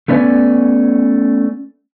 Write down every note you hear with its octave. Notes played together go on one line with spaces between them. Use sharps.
A3 B3 C#4 D5 G5 G#5